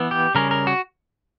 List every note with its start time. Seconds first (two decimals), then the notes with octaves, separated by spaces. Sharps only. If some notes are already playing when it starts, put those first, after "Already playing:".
Already playing: E3 B3
0.11 G4
0.35 C#3 G3 C#4 A#4
0.51 A#4
0.67 F#4